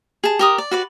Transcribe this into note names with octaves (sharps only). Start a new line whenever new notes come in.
G#4 A5
G4 A#4 D#6
D5
F#4 B4 D5